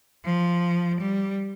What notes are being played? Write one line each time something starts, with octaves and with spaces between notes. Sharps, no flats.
F3
G3